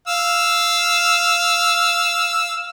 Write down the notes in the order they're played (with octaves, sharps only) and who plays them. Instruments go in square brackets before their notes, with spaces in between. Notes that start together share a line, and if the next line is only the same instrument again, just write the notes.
[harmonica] F5 E6